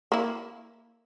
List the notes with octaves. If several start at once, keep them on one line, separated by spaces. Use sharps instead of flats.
A#3 E4